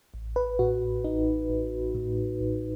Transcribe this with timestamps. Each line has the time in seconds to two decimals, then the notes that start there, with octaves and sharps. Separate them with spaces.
0.14 A1
0.36 B4
0.59 A2 F#4
1.04 A1 D#4
1.50 A1
1.95 A2
2.40 A1